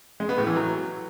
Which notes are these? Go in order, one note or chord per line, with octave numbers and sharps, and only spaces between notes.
G#3
B3
A2
E3
F#3